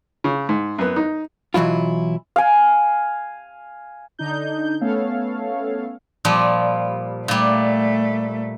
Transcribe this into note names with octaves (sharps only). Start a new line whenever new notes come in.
C#3
G#2
F#2 B3
D#4
B2 E3 F#3 E4 F4
F5 G#5
D3 D4 D#4 G6
A3 B3 C#4 A4 C#5 F5
A#2 F3 G3
A#2 G3 A3